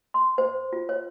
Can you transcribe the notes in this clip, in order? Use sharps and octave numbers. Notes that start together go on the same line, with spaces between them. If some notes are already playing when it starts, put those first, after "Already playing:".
C6
C5
F4
C#5